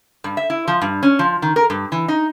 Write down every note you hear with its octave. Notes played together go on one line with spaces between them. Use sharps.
G2
E5
E4
F3
G2
C#4
F3
D#3
A#4
G2
E3
D#4